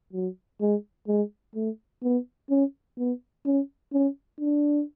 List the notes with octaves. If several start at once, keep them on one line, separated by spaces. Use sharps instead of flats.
F#3
G#3
G#3
A3
B3
C#4
B3
C#4
C#4
D4